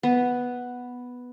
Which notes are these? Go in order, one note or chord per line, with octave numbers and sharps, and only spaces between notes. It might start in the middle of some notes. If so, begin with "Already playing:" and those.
B3